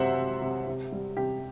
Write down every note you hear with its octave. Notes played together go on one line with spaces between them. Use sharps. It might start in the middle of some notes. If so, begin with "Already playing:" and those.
Already playing: F#2 C3 C5 E5 F#5
C3
C3
C3
G3
C3 G4